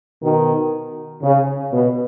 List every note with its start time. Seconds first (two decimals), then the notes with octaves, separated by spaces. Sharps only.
0.23 B2 D#3
1.22 C#3
1.72 B2